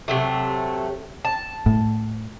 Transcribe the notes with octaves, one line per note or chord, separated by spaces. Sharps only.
C3 F#3 A3
A5
A2